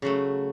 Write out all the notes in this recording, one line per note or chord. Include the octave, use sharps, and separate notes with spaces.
C#3 F#3 A3